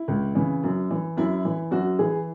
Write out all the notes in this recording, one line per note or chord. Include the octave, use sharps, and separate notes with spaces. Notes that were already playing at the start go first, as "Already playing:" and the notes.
Already playing: E4
C#2
C#3 E3
F#2
E3
F#2 E4
E3
F#2 F#4
E3 G#4